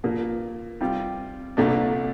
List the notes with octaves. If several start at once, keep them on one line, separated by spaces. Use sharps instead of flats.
A#2 F3 A#3
C3 G3 C4 F4
C2 A#2 A3 D4